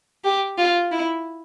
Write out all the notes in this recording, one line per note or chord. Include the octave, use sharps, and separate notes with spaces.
G4
F4
E4